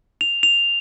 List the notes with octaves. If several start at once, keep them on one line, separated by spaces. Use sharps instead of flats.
F7
F7